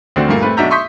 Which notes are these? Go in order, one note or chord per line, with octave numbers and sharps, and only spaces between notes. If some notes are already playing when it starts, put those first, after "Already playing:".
D2 D3 C4 F#4 D5
G2 A#2 A3 A#3
A3 C4 B4
B1 D4 F#4 E5 A#5 G6
E5 C6 C#6 D#6 G6 B6